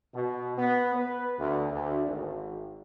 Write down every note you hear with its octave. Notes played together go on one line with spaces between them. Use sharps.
B2
B3
B4
D2
D2
G#1